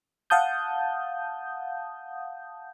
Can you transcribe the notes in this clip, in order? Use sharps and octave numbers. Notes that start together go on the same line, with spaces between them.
F5 F#5 A5 D#6 G6